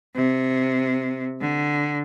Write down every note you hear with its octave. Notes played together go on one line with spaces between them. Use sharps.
C3
D3